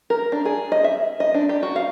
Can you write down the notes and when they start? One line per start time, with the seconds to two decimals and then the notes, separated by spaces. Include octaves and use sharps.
0.10 A#4
0.32 D4
0.45 G#4
0.72 D#5
0.84 E5
1.20 D#5
1.34 D4
1.49 G4
1.63 F#4
1.76 F5